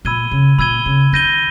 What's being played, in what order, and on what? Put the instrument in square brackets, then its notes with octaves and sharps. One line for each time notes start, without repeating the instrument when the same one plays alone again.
[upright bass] A#2 [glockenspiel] B5 E6 G#6 D#7 G7
[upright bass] C#3
[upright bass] A#2 [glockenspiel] B5 E6 G#6 D#7 G7
[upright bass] C#3
[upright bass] D#3 [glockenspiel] G6 A#6 D#7 G7